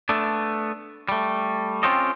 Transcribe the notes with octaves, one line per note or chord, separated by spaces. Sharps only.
A3 B3 D4
G3 A3
C4 C#4 F4 G4 A4 D#5